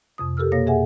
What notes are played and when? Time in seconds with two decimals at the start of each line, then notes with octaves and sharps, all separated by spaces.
0.18 F2 C3 D#6
0.37 G4 A4 A#4 E6 F6
0.52 B2 A#3 C#5 F5 A#6
0.67 F2 G#4 E5 F#5 G#5